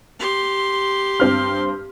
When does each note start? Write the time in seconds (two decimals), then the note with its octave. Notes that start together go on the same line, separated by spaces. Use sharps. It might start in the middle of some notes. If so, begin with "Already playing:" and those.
0.19 G4 C6
1.20 G2 C4 F6